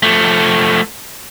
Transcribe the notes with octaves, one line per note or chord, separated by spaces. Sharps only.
F3 A3